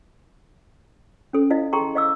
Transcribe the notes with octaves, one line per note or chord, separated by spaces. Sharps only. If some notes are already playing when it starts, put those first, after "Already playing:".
C#4 A4
E4 D#5 F5
G#4 A4 G5 A#5 C6 C#6
D#5 F5 D6 E6